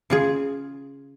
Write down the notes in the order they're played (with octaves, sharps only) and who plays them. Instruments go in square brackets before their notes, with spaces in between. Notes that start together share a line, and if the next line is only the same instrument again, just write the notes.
[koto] C#3 F4 G#4